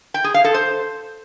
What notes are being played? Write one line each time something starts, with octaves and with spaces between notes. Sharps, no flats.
G5
G#4
F5
A4
C5